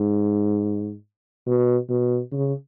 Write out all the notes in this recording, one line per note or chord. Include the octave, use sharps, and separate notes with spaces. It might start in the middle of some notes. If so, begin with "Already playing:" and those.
Already playing: G#2
B2
B2
C#3